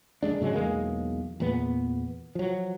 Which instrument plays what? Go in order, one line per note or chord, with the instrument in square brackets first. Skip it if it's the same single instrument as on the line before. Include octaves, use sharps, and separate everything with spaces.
[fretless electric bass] F#1 F2 G#3 D4
G#2 C#3 F#3 G#3
B1 E2 G#3 A#3
E2 A#2 B3
F3 F#3